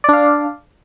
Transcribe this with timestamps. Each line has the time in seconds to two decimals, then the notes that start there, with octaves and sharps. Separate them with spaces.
0.04 D5
0.09 D4
0.13 F5